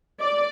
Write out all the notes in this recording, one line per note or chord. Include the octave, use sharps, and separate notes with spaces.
D5